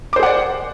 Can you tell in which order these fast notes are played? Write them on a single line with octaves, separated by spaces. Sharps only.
D6 C5 G#4 F#5 D5